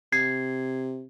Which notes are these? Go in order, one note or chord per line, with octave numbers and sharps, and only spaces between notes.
C3 G#6 C7